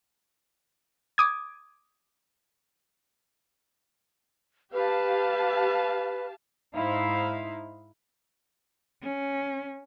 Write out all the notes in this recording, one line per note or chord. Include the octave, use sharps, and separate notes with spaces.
D6 D#6 G#6
G4 B4 F5 A5
G#2 D#4 E4 C5 F5
C#4